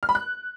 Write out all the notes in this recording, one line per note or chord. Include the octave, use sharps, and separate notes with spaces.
F6
B5
F#6